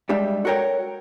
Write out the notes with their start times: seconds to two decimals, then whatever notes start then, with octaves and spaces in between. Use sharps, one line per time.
0.09 G3 G#3 D4 G4 E5
0.45 F#4 A4 A#4 C#5 G5